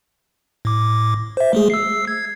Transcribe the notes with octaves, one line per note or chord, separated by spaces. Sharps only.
A2 D6
C5 E5
G#3 A3 G#4
E6 C7
G#6